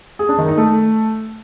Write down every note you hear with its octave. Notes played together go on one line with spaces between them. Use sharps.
G#4
D4
D#3
D#4
A3